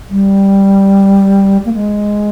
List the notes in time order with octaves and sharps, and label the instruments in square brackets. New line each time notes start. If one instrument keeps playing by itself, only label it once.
[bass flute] G3
A#3
G#3